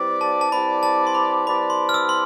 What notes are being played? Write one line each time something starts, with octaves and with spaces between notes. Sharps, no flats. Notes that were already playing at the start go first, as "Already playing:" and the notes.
Already playing: G3 C4 E4 B4 D5
A5
A5
G3 C4 E4 B4 D5 B5
A5
C6
B5
G3 C4 E4 B4 D5 B5
C6
F6
E6
C6